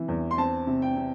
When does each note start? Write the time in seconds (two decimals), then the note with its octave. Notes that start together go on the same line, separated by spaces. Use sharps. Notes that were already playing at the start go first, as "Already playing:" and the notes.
Already playing: C3 E3
0.08 E2
0.31 C6
0.37 C4 A5
0.67 C3
0.82 G5
0.96 C3